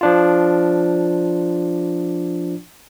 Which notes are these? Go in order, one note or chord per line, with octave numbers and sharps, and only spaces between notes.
F3 D4 F4